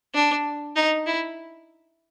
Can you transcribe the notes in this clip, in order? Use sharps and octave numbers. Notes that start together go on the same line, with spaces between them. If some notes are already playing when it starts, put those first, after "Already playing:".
D4
D#4
E4